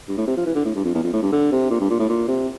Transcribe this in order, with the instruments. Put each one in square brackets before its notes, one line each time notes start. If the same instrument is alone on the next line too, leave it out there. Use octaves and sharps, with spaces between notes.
[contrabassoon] G2
A2
C3
F3
E3
D3
A2
G2
F2
E2
F2
A2
G2
D3
C3
A#2
G2
A#2
A2
A#2
C3